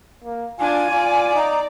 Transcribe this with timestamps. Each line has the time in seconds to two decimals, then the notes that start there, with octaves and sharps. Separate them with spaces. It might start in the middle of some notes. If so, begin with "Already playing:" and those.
0.24 A#3
0.59 D4 F4 G#5
0.90 F4 D5
1.35 D#4 A#5